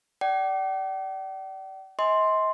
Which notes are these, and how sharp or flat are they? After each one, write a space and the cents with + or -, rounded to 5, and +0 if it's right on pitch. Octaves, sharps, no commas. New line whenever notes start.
D5 +0 G5 -45
D#5 +40 G#5 +0 C6 +0